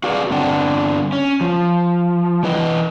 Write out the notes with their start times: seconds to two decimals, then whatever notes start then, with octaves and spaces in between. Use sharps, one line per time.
0.04 F#4 G#4 B4 D5 F5
0.31 G2 D3 C4 D4 F#5
1.12 C#4
1.41 F3
2.43 E3 E4 B4 D#5